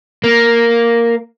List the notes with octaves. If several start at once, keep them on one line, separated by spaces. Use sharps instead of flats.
A#3